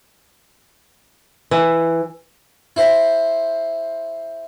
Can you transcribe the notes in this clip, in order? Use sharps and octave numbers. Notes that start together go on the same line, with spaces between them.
E3
E4 C5